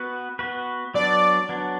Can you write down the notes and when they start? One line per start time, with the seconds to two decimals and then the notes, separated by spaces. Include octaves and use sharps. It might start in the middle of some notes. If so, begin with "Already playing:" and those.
Already playing: B3 F#4 B4
0.39 B3 F#4 B4
0.94 F#3 B3 D4 D5
1.49 F#3 B3 D4